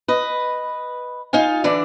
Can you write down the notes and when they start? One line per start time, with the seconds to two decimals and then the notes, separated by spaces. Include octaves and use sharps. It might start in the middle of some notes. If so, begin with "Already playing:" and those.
0.08 B4 D#5
1.33 D#4 F4 F5 G#5
1.64 D3 E3 D4 D5